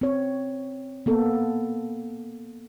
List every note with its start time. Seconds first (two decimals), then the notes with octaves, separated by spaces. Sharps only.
0.01 C4 C#5
1.06 A#3 B3 A4